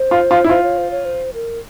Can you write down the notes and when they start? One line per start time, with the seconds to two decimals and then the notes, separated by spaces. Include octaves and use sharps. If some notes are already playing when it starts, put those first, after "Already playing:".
Already playing: C5
0.11 F4
0.31 F4
0.44 E4
0.49 F4 C5
0.63 C#5
0.78 C5
0.91 C#5
1.05 C5
1.34 A#4